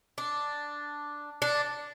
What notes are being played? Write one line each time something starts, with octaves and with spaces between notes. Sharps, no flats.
D4
D4